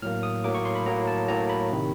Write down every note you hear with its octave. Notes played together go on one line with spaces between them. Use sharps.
A2 F#3 A#3 F6
D#6
A2 F#3 A#3 D6
C#6
C6
B5
A2 F#3 A#3 A#5
A5
A2 F#3 A#3 A#5
B5
C3 D#3